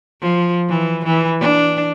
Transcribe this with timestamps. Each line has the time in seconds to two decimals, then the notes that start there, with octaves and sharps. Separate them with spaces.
0.22 F3
0.69 E3
1.05 E3
1.40 D4